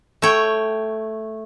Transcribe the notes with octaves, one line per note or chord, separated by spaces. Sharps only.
A3 C#5 G5